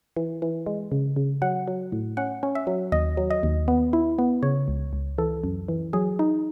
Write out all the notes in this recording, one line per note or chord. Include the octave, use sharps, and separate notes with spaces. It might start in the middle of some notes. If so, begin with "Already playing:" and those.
E3
E3
G#3
C#3
C#3
F#3 F#5
F#3
A2
C#4 F#5
C#4
E5
F#3
D#2 D#5
F#3
D#5
D#2
B3
E4
B3
C#3 C#5
C#2
C#2
E3 A4
F#2
E3
F#3 G#4
D#4